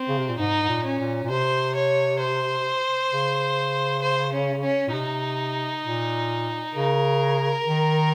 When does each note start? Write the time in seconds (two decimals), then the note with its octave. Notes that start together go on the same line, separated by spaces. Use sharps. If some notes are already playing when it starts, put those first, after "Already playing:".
Already playing: C4
0.09 C#3
0.18 C3
0.29 A#2
0.38 G#2 D#4
0.63 G#2
0.69 A#2
0.84 C#4
0.99 A#2
1.24 A#2
1.30 C3 C5
1.75 C#5
2.20 C5
3.11 C#3
4.02 C5
4.33 C#4
4.63 C#4
4.88 A#2
4.93 C3 D#4
5.84 A#2
6.74 C#3 A#4
7.66 D#3